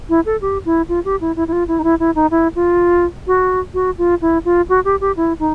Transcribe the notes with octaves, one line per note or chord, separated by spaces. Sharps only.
E4
A4
G4
E4
F4
G4
E4
E4
E4
F4
E4
D#4
E4
E4
D#4
E4
F4
F#4
F#4
F4
E4
F4
F#4
G4
G4
E4
D#4